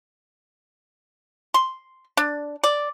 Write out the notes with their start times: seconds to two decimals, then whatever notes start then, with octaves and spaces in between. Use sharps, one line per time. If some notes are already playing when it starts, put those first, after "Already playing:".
1.54 C6
2.17 D4
2.64 D5